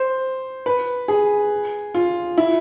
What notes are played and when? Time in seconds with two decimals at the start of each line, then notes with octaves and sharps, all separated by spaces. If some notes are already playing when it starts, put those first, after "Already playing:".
Already playing: C5
0.66 B4
1.08 G#4
1.95 F4
2.38 E4